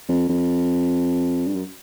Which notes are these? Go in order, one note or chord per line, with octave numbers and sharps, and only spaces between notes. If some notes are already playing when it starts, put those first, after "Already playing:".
F2
F2
G2
F#2